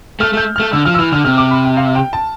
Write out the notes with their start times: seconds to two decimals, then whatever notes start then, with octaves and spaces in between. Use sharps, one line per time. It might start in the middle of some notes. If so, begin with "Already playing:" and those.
0.20 A3 F6
0.33 A3 G6
0.56 A3 F6
0.73 D3 E6
0.85 F3 F6
0.94 E6
0.99 E3 F6
1.12 D3 F6
1.25 C3 F6
1.38 D6
1.51 B5
1.65 G5
1.77 F5
1.95 G5
2.13 A5